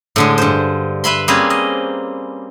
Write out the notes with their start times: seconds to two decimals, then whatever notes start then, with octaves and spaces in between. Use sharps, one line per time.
0.16 A2 D3 G#3
0.38 G2 C5
1.04 B4 E5 B5 C6
1.28 G3 A#3 C4 C#4 G#4 B4
1.50 D#5